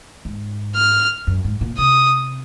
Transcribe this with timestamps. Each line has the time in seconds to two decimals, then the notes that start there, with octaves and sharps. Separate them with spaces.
0.25 G#2
0.76 F6
1.27 F#2
1.44 G#2
1.61 A#2
1.78 C3 D#6